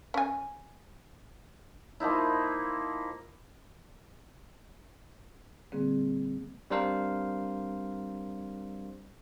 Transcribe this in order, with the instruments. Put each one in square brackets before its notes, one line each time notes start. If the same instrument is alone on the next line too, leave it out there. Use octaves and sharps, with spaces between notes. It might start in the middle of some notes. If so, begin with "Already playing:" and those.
[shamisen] C#4 G#5
[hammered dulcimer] F3 A#3 D#4 E4
[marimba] A#2 D3 G3 A#3 C4 G#4
[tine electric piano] G3 C4 D4 A#4 C5 F5